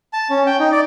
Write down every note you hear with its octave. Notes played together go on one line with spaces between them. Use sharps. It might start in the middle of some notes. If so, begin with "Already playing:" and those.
A5
C#4
G5
D#4
D5